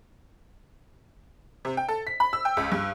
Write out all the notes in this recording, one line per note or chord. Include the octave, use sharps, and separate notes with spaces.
C3
G5
A4
B6
B5
E6
G5
C#2
G2